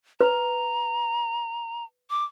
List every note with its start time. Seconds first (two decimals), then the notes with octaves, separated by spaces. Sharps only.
0.21 B4 A#5
2.10 D6